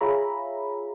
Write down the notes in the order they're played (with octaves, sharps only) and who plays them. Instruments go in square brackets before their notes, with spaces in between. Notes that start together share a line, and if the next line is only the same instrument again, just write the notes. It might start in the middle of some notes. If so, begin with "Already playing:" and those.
[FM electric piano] F4 G#4 C#5 E5 A#5 B5